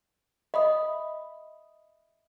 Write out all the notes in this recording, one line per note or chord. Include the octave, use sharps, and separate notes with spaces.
D#5 E5 B5 D#6